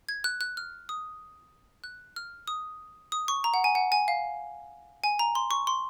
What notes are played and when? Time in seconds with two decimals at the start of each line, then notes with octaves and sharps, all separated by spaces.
0.09 G#6
0.24 F#6
0.41 F#6
0.57 F6
0.89 D#6
1.84 F#6
2.16 F6
2.48 D#6
3.12 D#6
3.28 C#6
3.44 A#5
3.54 F#5
3.64 G#5
3.75 F#5
3.92 G#5
4.08 F5
5.04 G#5
5.19 A#5
5.35 C6
5.51 C#6
5.67 C6